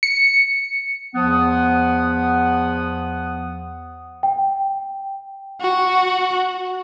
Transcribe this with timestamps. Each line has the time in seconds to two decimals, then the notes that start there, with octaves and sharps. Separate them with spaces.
0.03 C#7
1.14 E2 F3 B3 F#5 D#6
4.23 G5
5.61 F#4